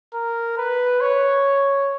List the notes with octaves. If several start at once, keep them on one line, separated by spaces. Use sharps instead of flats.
A#4
B4
C#5